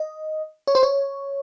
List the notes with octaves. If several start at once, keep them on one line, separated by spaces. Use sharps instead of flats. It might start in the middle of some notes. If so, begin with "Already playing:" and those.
Already playing: D#5
C#5
C5
C#5